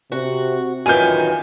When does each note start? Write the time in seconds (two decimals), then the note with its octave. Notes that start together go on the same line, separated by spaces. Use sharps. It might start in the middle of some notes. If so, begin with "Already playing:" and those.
0.12 C3 F#4
0.86 F#2 D#3 E3 F4 G#5 G6